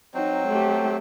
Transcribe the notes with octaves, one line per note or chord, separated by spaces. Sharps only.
F#3 C4 D#4
A3 G4